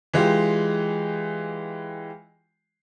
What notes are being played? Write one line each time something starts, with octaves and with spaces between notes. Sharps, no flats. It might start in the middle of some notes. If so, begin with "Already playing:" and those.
E3 G#3 F4 G4